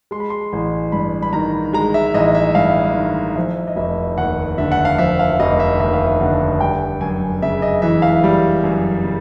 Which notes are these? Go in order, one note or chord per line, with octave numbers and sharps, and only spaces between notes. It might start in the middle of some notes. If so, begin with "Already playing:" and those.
G#3 C6
B5
C6
A1
G2 B5
B5
D#3 A#5
G#3 A#5
E5
A1 D#5
E5
G2 F5
D#3
F3 E5
D#5
F1 E5
D#2 F#5
D3 E5
F#5
F5
F3 E5
F5
F1 D#5
E5
D#2 E5
F5
E5
D3 F#5
G3 G5
F#2 G#5
C#3 E5
D#5
E3 E5
F5
G3
F#2
C#3